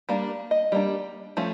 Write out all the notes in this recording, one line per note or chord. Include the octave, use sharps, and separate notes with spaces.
G3 A#3 D4
D#5
G3 A#3 D4
F3 A3 C#4